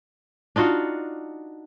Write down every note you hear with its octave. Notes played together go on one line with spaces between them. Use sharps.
D4 D#4 F4 F#4